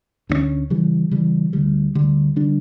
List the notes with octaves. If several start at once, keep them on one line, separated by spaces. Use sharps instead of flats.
D2 D3 F3 C#4
C#3 E3 G3
C#3 E3 G3
D2 D3 G3
D2 D3 G3
D3 G3 D4